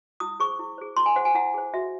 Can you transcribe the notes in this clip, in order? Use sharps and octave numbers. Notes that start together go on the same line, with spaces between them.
E4 D#6
G#4 C5 C#6
E4
G#4 C5
E4 C6
G#5
G#4 C5 F#5
G#5
E4 F#5
G#4 C5
F#4 E5